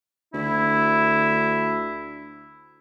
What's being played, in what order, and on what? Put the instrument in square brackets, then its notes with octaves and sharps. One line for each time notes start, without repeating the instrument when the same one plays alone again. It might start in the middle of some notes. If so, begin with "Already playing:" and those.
[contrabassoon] D2 [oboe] E4